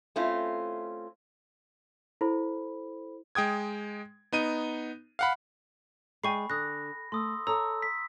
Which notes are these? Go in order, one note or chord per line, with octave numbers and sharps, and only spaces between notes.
A3 C4 C#4 E4 F4
E4 A4 C5 B5
G#3 G5 D#6 G#6
B3 D#4 D#7
F5 F#5 B5
G#3 D5 G5 G#5 B5 C#6 C7
D3 D#6 F#6 A#6
A3 C6 D#6 E6
A4 C#5 A#5 D#6 E6
B6